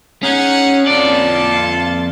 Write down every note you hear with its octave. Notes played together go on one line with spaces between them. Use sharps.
C#4 D#4 G#4 F#5
F2 F4 A4 D5 A5